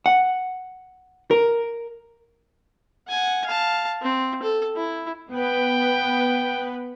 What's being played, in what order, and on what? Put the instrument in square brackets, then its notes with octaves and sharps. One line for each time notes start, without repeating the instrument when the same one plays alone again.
[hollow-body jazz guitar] F#5
A#4
[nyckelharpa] F#5 G#5
F5 A5
C4
A4
E4
[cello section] B3 B4 [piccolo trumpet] G5